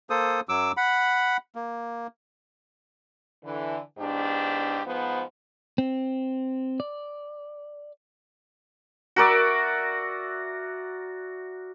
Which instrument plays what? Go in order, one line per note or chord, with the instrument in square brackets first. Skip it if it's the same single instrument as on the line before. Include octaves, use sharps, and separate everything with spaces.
[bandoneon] A#3 A4 C5 D#6
F#2 F#3 D6 E6
F#5 B5
A#3
[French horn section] D3 E3
E2 G#2 D4 G4
G#2 F3 B3
[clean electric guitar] C4
D5
[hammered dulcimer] F#4 A#4 D5 E5